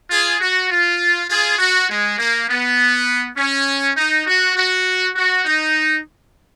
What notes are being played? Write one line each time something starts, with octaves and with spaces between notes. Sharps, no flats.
F4 G#4
F#4
F4
F4 G#4
F#4
G#3
A#3
B3
C#4
D#4
F#4
F#4
F#4
D#4